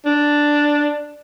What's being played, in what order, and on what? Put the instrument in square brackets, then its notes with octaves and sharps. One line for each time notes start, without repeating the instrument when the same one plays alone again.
[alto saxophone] D4